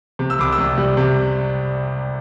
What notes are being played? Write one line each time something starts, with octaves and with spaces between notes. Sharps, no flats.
C3
E6
C2 D6
E6
C2
G3
C3